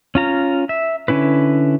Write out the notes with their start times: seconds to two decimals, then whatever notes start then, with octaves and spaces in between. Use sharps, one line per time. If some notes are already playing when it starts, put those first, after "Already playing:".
0.15 C#4 F4 A#5
0.69 E5
1.08 D3 C#4 E4 B4